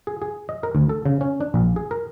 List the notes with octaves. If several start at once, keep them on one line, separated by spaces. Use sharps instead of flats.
G#4
G#4
D#5
A#4
D2
A4
C#3
C#4
D4
A#1
G#4
A#4